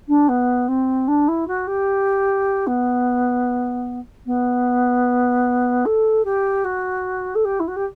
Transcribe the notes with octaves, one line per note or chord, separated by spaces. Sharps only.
D4
B3
C4
D4
E4
F#4
G4
B3
B3
A4
G4
F#4
A4
G4
E4
F#4
G4